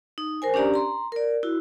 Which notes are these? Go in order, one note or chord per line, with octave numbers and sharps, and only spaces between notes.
D#4
A#4 C5 G#5
C#4 D4 G4 D5 A#5
A#5 C6
A#4 D5
E4 F#4